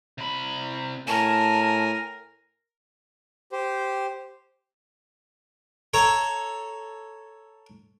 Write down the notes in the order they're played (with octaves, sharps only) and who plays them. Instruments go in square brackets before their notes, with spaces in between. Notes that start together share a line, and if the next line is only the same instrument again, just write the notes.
[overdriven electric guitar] C3 B5
[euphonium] A2 [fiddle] A#4 [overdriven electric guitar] G#5 [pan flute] A5
[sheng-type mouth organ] G4 C5
[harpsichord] A4 C#5 A#5